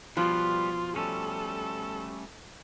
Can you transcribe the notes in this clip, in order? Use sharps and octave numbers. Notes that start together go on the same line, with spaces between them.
B2 F3 G3 F4 B4
G3 A3 C#4 A4